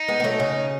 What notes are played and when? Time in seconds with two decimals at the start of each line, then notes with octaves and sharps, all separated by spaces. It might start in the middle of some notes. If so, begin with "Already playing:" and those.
Already playing: D#4
0.08 G#3 B3
0.20 B3
0.24 F#3 A3
0.40 C#3